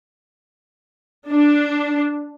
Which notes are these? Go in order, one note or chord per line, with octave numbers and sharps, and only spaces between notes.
D4